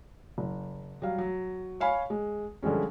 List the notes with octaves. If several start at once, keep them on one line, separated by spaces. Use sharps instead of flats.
F#1
F#3 G3 F5
F#3
C#5 F5 G#5 B5
G#3
D3 F3 G3 G#3 C#4